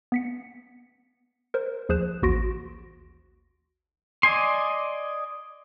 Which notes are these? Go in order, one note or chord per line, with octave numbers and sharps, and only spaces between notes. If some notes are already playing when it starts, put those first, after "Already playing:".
B3 B6 C#7
A#4 C5
D#2 F3 G#4 C5 F#6 E7
A1 D#2 F#4 C6 A#6 D7
D5 D#5 G#5 C6